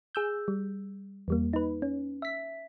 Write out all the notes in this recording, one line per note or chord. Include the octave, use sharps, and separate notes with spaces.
G#4 E6 G6
G3
E2 G3 A#3
D#4 B4
C#4
E5 B6